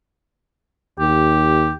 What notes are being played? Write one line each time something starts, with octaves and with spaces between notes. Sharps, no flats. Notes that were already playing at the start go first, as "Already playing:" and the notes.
D#2 G4